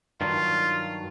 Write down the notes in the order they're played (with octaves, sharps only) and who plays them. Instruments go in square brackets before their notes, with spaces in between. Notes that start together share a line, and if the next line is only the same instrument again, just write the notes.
[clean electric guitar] G2 D#3 F#3 [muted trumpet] F4